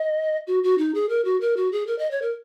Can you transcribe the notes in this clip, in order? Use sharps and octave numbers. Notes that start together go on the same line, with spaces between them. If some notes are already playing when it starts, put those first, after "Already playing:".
Already playing: D#5
F#4
F#4
D#4
G#4
A#4
F#4
A#4
F#4
G#4
A#4
D#5
C#5
A#4